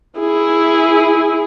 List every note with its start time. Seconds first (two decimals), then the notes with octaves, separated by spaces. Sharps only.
0.19 E4 G#4